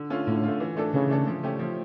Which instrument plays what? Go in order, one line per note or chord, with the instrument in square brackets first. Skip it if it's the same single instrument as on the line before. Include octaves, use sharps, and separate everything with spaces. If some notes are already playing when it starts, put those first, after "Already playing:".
Already playing: [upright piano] D3
A3 C#4 F4
[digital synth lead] A2 [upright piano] D3
[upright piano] A3 C#4 F4
E3
A3 D4 A4
[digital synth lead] C#3 [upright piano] E3
[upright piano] A3 D4 A4
F3
A3 C#4 G4
F3